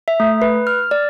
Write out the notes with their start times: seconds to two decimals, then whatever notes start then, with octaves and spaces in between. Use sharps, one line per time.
0.08 E5
0.20 A3
0.42 B4
0.67 F6
0.91 D5